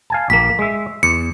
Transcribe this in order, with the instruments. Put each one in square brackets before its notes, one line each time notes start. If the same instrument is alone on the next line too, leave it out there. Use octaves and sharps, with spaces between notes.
[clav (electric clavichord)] F5 G#5 A5
[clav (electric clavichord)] A#1 A#3 [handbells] B6
[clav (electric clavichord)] G#3 E5
[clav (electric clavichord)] E2 [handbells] C#7